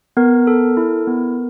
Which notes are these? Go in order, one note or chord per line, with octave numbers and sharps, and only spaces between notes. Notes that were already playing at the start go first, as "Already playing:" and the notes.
B3 A#4
A4
E4
B3